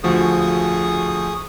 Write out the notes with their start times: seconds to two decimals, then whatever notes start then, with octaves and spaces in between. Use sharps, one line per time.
0.04 D2 F3 F#4 G#4 C#6 D#6